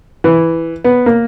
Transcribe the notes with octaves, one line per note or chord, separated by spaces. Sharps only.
E3
B3
A#3